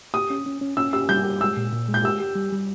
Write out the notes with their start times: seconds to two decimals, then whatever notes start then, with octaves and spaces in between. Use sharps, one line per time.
0.14 G4 D#6
0.30 C#4
0.46 C#4
0.61 C#4
0.77 C#4 E6
0.93 G4 E6
1.09 G3 G6
1.25 G4
1.41 G#3 E6
1.57 A#2
1.73 A#2
1.89 G#3
1.94 G6
2.04 G4 E6
2.20 G4
2.35 G3
2.52 G3